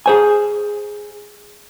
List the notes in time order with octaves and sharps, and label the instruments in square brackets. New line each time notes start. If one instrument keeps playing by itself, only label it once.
[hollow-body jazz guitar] G#4 C5 G#5